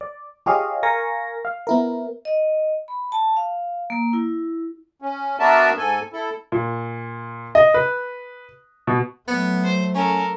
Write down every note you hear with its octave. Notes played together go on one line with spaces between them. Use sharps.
D5
F4 G4 G#4 C#5 D#5 F5
A#4 F5 G#5 C#6 A#6
F5
B3 E4 A#4
D#5
B5
A5
F5
A#3
E4
C#4
B3 D4 F#4 A#4 E5 A5
G#2 A4 G#5
E4 A4
A#2
D#5
B4
B2
F#3 A3 B3
C5
C#4 A4 A#4